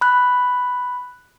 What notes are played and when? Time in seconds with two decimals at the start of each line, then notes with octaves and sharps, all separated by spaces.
0.01 B5 F#6